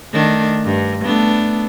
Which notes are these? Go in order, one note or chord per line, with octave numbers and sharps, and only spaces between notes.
D#3 A3 D4
G2
A3 B3 D4